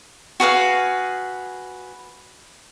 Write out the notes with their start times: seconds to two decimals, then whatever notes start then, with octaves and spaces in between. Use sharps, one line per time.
0.40 F#4 G#4 B4 F5